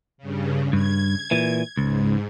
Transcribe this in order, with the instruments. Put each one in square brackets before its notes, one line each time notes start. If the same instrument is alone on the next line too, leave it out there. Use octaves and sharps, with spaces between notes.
[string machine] G2 C#3
[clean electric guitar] G2 [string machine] G#6
[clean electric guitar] A#2 E3
[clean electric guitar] C#2 [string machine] G#2